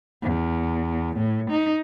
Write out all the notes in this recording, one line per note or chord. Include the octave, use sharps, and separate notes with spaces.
E2
A2
D#4